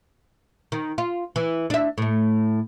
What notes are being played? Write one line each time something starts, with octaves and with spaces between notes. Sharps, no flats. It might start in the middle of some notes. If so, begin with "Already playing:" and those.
D#3
F4
E3
D4 E5
A2 A3